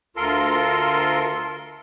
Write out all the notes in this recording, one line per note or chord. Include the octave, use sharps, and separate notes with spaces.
D2 F4 A4 A#4 C6